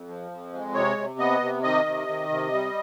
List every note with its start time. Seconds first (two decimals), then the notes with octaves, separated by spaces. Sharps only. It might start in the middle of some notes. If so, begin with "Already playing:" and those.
Already playing: F2
0.08 F3
0.31 F2
0.53 G#3
0.74 C3 C#5
0.97 C3
1.19 B3 D#5
1.41 C3
1.63 D#3 D#5
1.86 C3
2.08 D#3
2.30 C3
2.53 G3